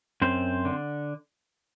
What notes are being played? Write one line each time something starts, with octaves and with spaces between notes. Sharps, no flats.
F#2 C4 C5
D3